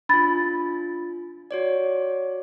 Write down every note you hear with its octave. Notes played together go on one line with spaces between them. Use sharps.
D4 F4 B5 A6
F#4 C#5 D5